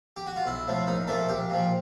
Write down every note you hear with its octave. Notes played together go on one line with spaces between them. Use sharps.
G4
F#4
F4
B1 E4
A2 F3 A3
A#1 D#4
A#2 F3 A3 A4
A#1 G4
A#2 F3